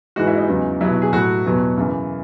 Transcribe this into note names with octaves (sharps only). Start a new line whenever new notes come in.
G#2 E3 G#3 F#4
E4
D#4
E2 C#3 F#3
B2 F#3 E4
G#4
A2 F#3 F#4
E2 B2 F#3
F#2 C#3 E3